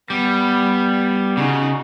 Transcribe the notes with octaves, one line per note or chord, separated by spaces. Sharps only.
G3 B3
C#3 D#4 F#4